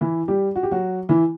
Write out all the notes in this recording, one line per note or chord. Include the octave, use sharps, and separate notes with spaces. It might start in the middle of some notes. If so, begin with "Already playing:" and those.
E3 E4
G3 G4
F#4
G4
F#3 F#4
E3 E4